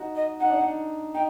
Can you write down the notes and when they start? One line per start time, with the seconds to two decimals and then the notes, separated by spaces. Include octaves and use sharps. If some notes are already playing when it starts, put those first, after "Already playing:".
Already playing: D#4 F#4
0.15 D#5
0.40 D#4 F#5
0.50 D4
0.61 D#4
1.14 D#4 G5